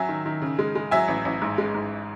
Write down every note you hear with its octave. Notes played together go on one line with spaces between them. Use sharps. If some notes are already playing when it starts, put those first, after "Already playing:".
Already playing: F#3 E5 G#5
D#3
D#3
C#3
G#3
G#3
F#3 E5 G#5
A1
A1
G#2
G#3
G#2